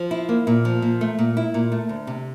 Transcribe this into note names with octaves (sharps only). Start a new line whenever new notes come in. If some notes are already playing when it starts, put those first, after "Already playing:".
Already playing: F3
E4
A#3
A#2
F3
A#2
A3
A#2
E4
A#2
A3
D2
C3